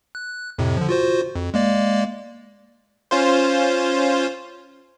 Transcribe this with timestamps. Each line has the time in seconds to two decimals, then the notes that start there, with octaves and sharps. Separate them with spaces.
0.15 F#6
0.59 F2 A2 C3
0.77 D3 F3
0.89 F4 F#4 C5
1.35 F2
1.54 G#3 A#3 D5
3.11 C#4 F4 C5